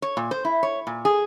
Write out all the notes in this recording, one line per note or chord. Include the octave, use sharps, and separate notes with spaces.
C#5
A#2
C5
E4
C#5
A#2
G#4